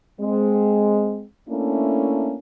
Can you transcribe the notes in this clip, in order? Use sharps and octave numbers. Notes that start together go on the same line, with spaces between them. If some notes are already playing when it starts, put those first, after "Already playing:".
G#3 C4
A3 A#3 C#4 D4 E4